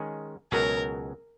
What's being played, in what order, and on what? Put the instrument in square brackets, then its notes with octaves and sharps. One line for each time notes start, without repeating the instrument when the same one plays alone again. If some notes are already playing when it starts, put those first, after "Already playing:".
Already playing: [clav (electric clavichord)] D#3 G#3 C#4 G#4
[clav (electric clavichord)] C#2 B2 F#3 C#4 G#4 [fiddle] A#4